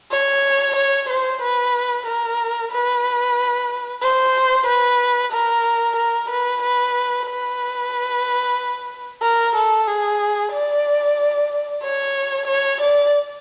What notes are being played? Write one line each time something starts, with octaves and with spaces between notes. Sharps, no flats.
C#5
C#5
C5
B4
A#4
B4
C5
B4
A#4
A#4
B4
B4
B4
A#4
A4
G#4
D5
C#5
C#5
D5